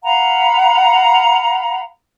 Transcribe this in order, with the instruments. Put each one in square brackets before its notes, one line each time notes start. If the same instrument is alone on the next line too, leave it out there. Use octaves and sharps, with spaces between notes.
[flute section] F5 F#5 A#5 B5